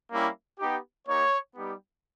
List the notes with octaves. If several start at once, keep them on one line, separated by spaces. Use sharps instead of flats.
G3 A#3 C#4 E4 G4
B3 D#4 G4
A#3 D#4 G4 C#5
G3 B3 D#4 G4